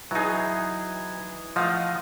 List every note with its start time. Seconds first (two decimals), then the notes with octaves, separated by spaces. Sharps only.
0.11 E3 F#3 D#4 G#4
1.56 F3 A3 D#5 F5 F#5